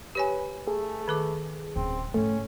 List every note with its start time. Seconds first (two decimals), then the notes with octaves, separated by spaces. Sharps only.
0.15 G4 B4 C#5 G#5
0.67 A3 G#4
1.08 D#3 A4 D6
1.76 D1 C4 C#4
2.14 G#2 C#3 A3 C#4